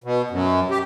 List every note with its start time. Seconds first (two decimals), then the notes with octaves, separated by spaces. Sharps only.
0.04 B2
0.30 F#2
0.71 G4